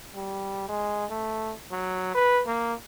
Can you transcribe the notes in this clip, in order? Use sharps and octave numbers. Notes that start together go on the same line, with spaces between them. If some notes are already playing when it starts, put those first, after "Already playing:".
G3
G#3
A3
F#3
B4
A#3